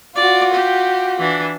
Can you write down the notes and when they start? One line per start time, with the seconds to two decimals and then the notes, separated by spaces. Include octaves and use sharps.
0.16 F4 F#4 D5
0.54 G4
1.19 E3 D4